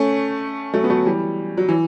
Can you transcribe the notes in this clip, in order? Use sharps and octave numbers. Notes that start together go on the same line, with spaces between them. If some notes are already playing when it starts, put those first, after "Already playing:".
Already playing: A3 C#4
F#3 A3
B3
F#3 A3
E3 G3
F#3
E3